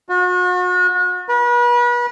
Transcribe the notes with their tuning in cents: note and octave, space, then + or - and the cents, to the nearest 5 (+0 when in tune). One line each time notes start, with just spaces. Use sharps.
F#4 -40
B4 -35